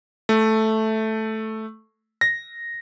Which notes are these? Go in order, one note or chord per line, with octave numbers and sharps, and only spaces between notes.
A3
A#6